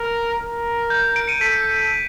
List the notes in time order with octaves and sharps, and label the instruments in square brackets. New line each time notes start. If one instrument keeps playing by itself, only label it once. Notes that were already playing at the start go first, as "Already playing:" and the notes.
Already playing: [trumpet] A#4
A#4
[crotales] G6
D7
C#7 D#7
[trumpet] A4 [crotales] B6 C#7